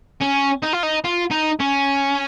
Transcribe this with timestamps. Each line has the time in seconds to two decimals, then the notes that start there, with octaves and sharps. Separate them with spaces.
0.21 C#4
0.62 D#4
0.73 F4
0.83 D#4
1.04 F4
1.31 D#4
1.60 C#4